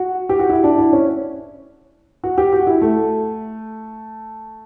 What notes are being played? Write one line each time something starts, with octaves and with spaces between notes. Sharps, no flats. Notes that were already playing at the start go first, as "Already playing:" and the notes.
Already playing: F#4
G4
F#4
E4
D4
E4
C#4
F#4
G4
F#4
E4
A3